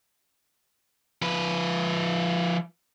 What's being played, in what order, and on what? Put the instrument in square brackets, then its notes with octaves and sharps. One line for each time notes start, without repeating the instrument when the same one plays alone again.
[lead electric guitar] F3 B4